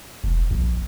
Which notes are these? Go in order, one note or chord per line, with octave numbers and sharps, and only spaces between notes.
E1
A#1